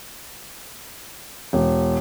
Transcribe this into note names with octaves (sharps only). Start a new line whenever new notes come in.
E1